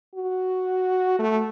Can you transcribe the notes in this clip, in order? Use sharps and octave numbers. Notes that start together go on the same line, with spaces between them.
F#4
A3